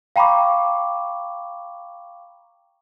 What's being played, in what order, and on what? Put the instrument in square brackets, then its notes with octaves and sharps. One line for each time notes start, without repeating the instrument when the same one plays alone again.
[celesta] F5 G5 A#5 B5 C#6 D6